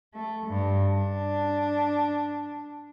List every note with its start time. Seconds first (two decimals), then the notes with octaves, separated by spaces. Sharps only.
0.14 A3
0.47 G2
0.97 D4